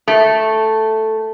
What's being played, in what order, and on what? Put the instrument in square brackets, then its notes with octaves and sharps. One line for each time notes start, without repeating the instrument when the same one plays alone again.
[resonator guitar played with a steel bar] A3